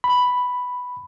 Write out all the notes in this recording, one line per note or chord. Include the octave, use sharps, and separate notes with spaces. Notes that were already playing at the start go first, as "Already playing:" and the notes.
B5